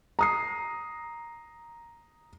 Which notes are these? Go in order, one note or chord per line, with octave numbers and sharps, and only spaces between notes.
A#5 D#6 C7